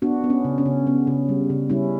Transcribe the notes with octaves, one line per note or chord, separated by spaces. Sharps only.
B3 D4 F#4
B3
C#4
C#3
C#4
C#3
B3
C#3
G3
C#3
G3 C#4 E4